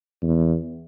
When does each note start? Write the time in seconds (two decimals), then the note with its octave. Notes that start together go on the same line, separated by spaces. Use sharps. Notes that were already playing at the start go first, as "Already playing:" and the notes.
0.22 E2